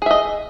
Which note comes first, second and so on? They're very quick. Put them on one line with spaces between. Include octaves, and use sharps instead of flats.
G#4 E5 D#5